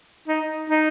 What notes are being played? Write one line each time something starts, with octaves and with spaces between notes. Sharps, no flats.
D#4
D#4